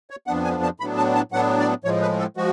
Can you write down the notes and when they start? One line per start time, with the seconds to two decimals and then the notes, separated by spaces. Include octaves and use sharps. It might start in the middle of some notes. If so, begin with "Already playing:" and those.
0.10 C#5
0.27 F2 F3 B3 D4 F#5
0.44 G#5
0.63 A5
0.80 A2 F#3 B3 D4 B5
0.97 A5
1.15 A5
1.32 A2 F#3 B3 D4 F#5
1.59 D5
1.84 A2 F3 G#3 C#5
2.02 B4
2.19 A4
2.37 F3 G#3 F#4